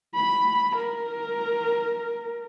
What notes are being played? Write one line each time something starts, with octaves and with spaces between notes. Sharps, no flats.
B5
A#4